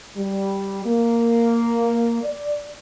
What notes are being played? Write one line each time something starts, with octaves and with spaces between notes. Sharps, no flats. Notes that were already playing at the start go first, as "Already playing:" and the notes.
G3
A#3
D5